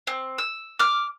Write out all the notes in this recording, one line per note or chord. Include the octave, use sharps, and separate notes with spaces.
C4
E6
D6 F6